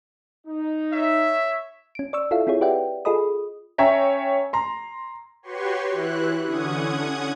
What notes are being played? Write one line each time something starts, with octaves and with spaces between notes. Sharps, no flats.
D#4
C#5 E5
C#4 D7
D5 C#6 E6
E4 F4 A4 E5 F5
C4 E4 F4 G#4 C#5
G4 B4 D5 E5 F#5 G5
F4 G#4 A4 D#5 B5 D#6
C#4 C#5 E5 G5 A#5
A#5 C6
F#4 G4 B4 C#5 C6 C#6
E3 E4 F#6
D3 C#4 F#5 D#6 G#6